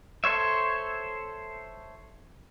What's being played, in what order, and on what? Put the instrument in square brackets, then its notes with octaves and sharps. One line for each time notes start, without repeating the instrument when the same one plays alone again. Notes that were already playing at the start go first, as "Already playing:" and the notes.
[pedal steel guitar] A4 C5 C#5 E5